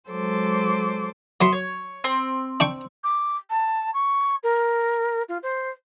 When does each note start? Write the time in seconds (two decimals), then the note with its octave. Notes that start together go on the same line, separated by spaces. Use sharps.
0.10 F#3 G#3 A4 C5 D6
1.41 F#3 B3 E5 C6
1.53 C#5
2.04 C4
2.60 D4 G5 C#6
3.04 D6
3.50 A5
3.94 C#6
4.43 A#4
5.29 F4
5.43 C5